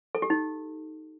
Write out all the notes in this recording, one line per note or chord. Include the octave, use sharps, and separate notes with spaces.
A4
G4
D#4